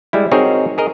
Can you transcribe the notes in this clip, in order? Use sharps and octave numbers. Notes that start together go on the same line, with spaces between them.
G3 G#3 E4
C4 D#4 F#4 G#4 A#4 C#5
G#4 A#4 D#5